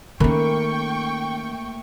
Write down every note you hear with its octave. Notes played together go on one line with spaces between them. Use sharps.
D#3 A3 A#3 C#4 A#4 B4 G5 C#6